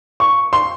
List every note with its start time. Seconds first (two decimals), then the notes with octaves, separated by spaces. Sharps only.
0.20 C#6
0.53 C6